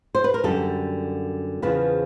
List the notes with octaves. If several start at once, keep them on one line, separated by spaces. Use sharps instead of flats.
C5
B4
A#4
F#2 D3 G3 A4
E2 C#3 F3 B4